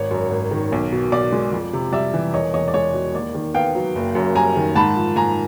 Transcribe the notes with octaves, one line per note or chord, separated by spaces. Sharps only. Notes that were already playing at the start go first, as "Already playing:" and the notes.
Already playing: G#1 C#5
F#2
G#1
D#3
B1
B2
B1 D5
G#3
F2
C3
G3 D5 E5
E3
E1 C#5 D#5
E2 C#5 D#5
D5
G#3 C#5
B2
D#2 D5
D#3
B3 F5 G5
F#3
F#1
F#2
G3 G#5 A#5
D#3
G#2 A5 B5
F3
G#2 G#5 A#5